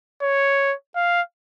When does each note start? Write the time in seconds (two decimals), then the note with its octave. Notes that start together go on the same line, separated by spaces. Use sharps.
0.22 C#5
0.96 F5